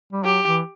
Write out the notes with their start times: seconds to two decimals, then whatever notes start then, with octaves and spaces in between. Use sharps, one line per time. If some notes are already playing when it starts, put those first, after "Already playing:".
0.13 G3
0.24 F#3 G4
0.46 E3